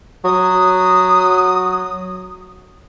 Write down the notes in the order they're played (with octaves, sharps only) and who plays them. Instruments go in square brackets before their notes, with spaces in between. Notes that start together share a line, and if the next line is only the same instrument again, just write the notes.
[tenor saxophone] F#3 [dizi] D#6